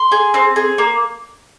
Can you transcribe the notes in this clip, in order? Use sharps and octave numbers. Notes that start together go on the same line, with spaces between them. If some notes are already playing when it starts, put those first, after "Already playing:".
Already playing: C6
G#4
C4
G#4
A#3